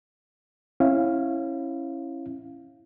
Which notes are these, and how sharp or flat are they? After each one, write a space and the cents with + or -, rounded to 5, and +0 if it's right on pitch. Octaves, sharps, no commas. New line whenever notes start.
C#4 -25 E4 +5 F5 +0